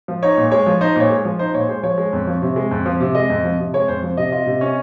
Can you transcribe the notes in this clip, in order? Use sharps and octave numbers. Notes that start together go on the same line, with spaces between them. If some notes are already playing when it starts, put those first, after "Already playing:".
F3
D#4 C#5
A#2
G#3 C#5
F3
D#4 C5
A#2 C#5
G#3
F3
D#4 C5
A#2 C#5
G#3 C5
F3 C#5
G#3
F2
F3
C3
G#3
F2
F3
C3
G#3 D#5
F2
F3
C3
G#3 C#5
F2 C5
F3
C3 D#5
F4 D#5
C3
C#4